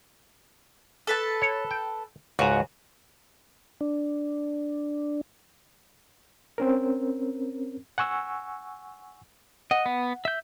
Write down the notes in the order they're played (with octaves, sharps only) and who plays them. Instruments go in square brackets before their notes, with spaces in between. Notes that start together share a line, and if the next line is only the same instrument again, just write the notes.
[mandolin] A4 B4 A5
[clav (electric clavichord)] C#5
G5
[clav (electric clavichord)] C#2 G#2 [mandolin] F#4
[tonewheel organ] D4
[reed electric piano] C4 C#4 A#4
F#5 G#5 C#6 E6
[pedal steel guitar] D#5 [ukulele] F#5
[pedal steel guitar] B3
E5 G6